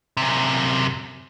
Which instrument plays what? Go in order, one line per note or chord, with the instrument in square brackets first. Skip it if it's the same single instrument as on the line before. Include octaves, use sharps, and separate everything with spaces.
[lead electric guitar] F#2 C3